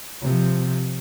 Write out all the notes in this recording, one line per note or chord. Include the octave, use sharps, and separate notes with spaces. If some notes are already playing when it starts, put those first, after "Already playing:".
C3 F3